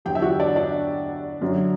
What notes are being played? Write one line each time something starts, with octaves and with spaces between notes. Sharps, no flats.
E2 D3 F#3 G4 G5
E5
F#4 F#5
D4 D5
D4 D5
F#2 D3 F#3